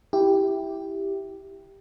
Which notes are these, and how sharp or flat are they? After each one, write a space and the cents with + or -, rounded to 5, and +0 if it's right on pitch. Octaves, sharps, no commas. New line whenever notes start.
E4 +0 G4 +0